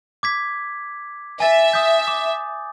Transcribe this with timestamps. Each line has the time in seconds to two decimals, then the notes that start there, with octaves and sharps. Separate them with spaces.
0.23 D6 G#6 B6
1.40 E5 G#5 A6
1.73 D#6 G6
2.08 D6